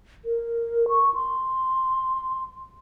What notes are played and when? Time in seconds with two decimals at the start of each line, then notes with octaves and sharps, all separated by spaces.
0.25 A#4
0.89 C#6
1.14 C6